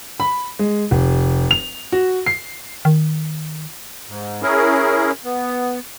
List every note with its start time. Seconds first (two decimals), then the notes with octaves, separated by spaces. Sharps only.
0.20 B5
0.59 G#3
0.91 F1
1.51 F7
1.92 F#4
2.26 C7
2.85 D#3
4.08 G#2
4.42 C#4 E4 G#4 A#4
5.24 B3